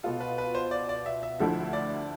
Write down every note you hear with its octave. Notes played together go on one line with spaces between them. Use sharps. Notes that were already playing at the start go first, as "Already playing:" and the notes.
B2 B3 F4 A4
B4
B4
C5
D5
D5
E5
E5
D2 D3 F3 A3 E4 E5
D5